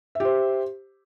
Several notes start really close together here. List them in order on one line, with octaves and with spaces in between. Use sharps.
E5 G4 C5